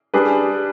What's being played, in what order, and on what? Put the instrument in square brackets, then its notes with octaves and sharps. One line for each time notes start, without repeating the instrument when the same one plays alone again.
[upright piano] G3 D4 G#4 B4